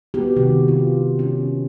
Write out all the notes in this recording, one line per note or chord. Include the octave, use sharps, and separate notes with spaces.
B3 F#4 G4
C3 D#3 F#4
F4
C#4